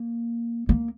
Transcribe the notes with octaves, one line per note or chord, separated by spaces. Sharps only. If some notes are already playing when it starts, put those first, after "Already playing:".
Already playing: A#3
A#3